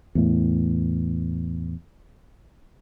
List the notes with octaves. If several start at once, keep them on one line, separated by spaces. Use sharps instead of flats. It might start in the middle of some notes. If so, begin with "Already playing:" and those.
E2 A2